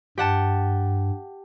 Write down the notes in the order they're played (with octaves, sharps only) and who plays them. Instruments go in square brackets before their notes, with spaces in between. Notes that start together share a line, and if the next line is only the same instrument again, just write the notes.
[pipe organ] G2 [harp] G4 F#5 A5